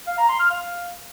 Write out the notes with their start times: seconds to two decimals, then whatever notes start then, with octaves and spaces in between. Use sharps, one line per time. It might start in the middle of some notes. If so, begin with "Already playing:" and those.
0.07 F5
0.18 A#5
0.29 C6
0.40 F6
0.50 F5